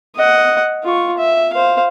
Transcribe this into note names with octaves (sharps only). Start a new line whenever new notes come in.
D#5 F#5
F4 C#6
E5
C5 F5